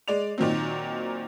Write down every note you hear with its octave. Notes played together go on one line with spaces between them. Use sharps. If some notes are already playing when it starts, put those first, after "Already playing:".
G#3 D5 F7
A#2 D#3 F#3 C4